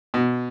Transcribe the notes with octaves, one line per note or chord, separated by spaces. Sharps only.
B2